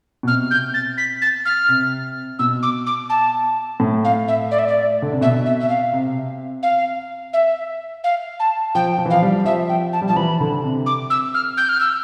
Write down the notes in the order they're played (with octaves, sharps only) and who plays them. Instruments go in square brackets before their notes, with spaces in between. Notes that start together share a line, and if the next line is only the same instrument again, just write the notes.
[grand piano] B2
[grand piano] C3 [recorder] F6
[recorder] G6
A6
B6
A6
F6
[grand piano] C3
[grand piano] B2 [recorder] E6
[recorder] D6
D6
A5
[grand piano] A2
[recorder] F5
E5
D5
E5
D5
[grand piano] D3
C3
[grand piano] B2 [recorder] E5
[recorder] E5
E5
F5
[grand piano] C3
[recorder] F5
E5
F5
A5
[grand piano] F3 [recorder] G5
[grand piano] F3
E3
[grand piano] F3 [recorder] F5
[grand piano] G3
[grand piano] F3 [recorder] E5
[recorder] G5
A5
[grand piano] G3
[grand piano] F3 [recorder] A5
[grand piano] E3 [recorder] B5
[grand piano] D3
C3
[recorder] D6
E6
F6
G6
F6
E6